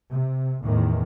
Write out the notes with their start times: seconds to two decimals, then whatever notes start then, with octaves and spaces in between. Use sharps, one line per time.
0.12 C3
0.62 E2 A2 D#3